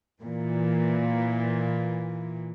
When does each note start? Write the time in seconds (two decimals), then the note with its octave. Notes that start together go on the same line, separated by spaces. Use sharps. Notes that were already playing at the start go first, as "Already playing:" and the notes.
0.21 A#2 E3